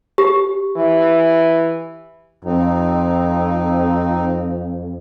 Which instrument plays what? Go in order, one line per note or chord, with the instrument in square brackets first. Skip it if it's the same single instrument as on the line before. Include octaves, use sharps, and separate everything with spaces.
[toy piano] G4
[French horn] E3
[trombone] F2 [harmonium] C4 D#4